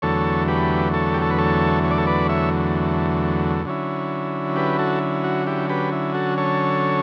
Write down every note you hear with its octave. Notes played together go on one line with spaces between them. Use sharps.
E2 D3 F#3 A3 A4 C#5
G4 B4
A4 C#5
G4
A4
B4
A4 C#5
C#5
D5
A4 C#5
B4 D5
C#5 E5
D3 F#3 C#4 E4
G4 B4
F#4 A4
F#4
E4 G4
G4 B4
E4
F#4 A4
A4 C#5